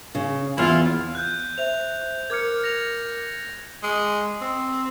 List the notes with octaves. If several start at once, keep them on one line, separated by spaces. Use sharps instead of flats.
C#3
E2 E4 F4
F#6 G6
C5 E5 F7
A#4 D6 F6 G#6 C#7
A#6 F7
G#3
C4